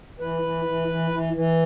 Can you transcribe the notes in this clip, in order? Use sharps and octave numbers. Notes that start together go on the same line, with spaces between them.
E3 B4
E3
E3
E3
E3
E3